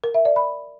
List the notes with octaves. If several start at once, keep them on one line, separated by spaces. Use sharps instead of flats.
A#4
E5
D5
B5